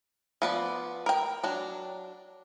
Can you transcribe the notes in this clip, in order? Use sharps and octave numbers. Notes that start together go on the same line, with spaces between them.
F3 B3 D5
A#4 G5
F#3 D4